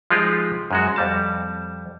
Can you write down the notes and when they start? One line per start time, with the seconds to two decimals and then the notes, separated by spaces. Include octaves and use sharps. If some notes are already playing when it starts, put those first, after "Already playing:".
0.10 F3 G#3 D#4 F4 G4 G#4
0.71 F#2 G#3 F#4
0.96 F2 G3 A5